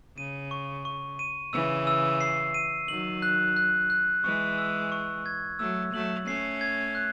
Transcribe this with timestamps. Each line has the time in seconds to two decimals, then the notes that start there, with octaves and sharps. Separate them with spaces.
0.17 C#3 D#7
0.51 C#6
0.85 C#6
1.19 D#7
1.53 C#3 E3 E6
1.87 E6
2.21 C7
2.54 D#7
2.88 D#3 F#3 F#7
3.22 F#6
3.56 F#6
3.90 F#6
4.24 E3 G#3 C#6
4.58 E6
4.92 C#6
5.26 G#6
5.59 F#3 A3 E6
5.93 F#3 A3 F#7
6.27 A3 C#4 C7
6.61 G#6
6.95 F#6